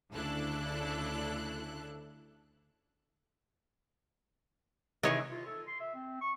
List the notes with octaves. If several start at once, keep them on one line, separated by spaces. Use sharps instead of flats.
D2 C#3 D4 E4 A4 F#6
C3 D#3 E3 G#4 C#5 D#5
F4
A4
C6
E5
C4
C#6